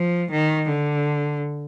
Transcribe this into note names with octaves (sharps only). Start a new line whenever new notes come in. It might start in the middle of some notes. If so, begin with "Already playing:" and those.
Already playing: F3
D#3
D3